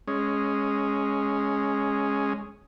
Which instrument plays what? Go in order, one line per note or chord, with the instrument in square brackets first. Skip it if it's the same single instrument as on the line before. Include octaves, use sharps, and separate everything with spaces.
[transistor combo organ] G#3 C#4